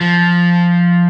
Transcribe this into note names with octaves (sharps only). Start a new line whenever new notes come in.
F3